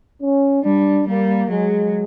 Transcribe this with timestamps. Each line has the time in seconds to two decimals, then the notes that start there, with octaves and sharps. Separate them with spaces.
0.22 C#4
0.64 G3 D4
1.08 G3 A#3
1.50 F#3 G#3